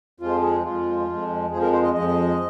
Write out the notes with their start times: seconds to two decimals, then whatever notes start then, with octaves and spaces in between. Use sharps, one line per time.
0.20 F2 F3 G#3 F4
0.42 G#4
0.64 F2 F3 G#3 F4
1.08 F2 F3 G#3
1.50 F2 F3 G#3 G#4
1.62 A#4
1.72 C5
1.83 D#5
1.94 F2 F3 G#3 D#5